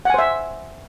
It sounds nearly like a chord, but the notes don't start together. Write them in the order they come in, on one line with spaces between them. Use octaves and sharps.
F#5 G#5 C5 E5